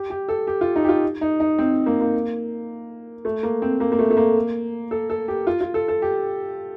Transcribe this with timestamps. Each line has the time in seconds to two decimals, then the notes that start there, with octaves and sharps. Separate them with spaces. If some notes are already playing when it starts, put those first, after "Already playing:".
Already playing: G4
0.10 G4
0.28 A4
0.47 G4
0.61 F4
0.76 D#4
0.84 G4
0.89 F4
1.21 D#4
1.40 D#4
1.59 C4
1.86 A#3
2.01 A#3
3.25 A3
3.43 A#3
3.62 C4
3.80 A#3
3.92 A#3
3.99 A3
4.10 A3
4.17 A#3
4.91 A4
5.10 A4
5.28 G4
5.47 F4
5.61 F4
5.74 A4
5.88 A4
6.02 G4